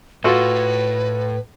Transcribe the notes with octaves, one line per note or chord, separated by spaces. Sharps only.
A2 F4 F#4 A4 B4